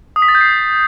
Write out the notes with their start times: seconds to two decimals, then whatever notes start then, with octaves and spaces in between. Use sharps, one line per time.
0.16 D#6
0.22 B6
0.28 A6
0.35 G6
0.41 C7